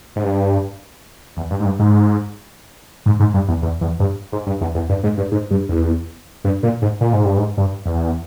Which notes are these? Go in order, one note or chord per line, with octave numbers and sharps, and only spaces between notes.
G#2
G2
E2
G2
G#2
G2
G#2
G#2
G#2
G2
E2
E2
E2
G2
G#2
G2
E2
E2
G2
G#2
G2
G#2
G2
E2
G2
A#2
G#2
A#2
G#2
G2
G#2
G2
E2